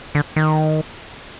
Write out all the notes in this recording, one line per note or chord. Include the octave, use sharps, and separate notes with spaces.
D3
D#3